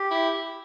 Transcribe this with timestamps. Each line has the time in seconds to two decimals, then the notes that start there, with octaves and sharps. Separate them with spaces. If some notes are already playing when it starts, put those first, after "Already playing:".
Already playing: G4
0.11 E4